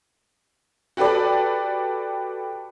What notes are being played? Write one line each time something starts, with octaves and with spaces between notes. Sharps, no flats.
F#4 G4 A4 B4 D5